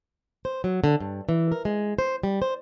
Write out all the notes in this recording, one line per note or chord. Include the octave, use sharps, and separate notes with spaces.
C5
F#3
D3
G2
E3
A#4
G#3
C5
G3
C5